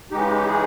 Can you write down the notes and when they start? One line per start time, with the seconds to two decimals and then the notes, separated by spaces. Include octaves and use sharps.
0.11 C#3 E3 G#3 D#4 G4
0.46 G#4